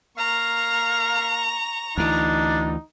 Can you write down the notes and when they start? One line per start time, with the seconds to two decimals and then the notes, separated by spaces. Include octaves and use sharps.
0.18 A#3 F5 A#5 C#6
1.97 D2 E3 D4 D#4